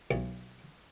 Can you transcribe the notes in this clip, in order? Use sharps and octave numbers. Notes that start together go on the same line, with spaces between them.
B1